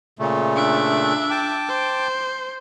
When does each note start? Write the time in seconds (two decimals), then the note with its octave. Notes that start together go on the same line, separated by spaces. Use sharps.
0.19 A#2 C#3 A3
0.56 D4 E5
1.30 G5 A5 D6
1.69 C5